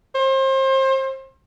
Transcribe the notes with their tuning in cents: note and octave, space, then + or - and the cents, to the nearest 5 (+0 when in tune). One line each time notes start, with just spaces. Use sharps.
C5 +30